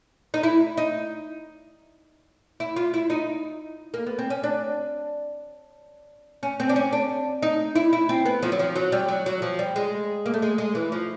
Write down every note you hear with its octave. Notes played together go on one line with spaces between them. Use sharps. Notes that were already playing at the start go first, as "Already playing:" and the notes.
D#4
E4
D#4
E4
F4
E4
D#4
A#3
B3
C4
C#4
D4
C#4
C4
D4
C#4
D4
D#4
E4
E4
C4
B3
F3
F#3
F3
F#3
G3
F#3
F#3
F3
G3
G#3
A#3
A3
G#3
G#3
E3
F3